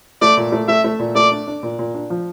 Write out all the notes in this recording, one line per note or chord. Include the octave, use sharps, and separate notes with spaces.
A3 D5
A#2
A3
A3 E5
A3
A#2
A3 D5
D4
D4
A#2
A#2
D4
F3